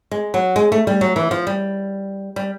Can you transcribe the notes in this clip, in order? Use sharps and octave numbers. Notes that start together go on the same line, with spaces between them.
G#3
F#3
G#3
A3
G3
F#3
E3
F3
G3
G3